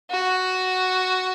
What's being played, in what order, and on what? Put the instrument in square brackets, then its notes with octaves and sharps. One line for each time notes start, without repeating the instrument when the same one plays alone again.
[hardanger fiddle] F#4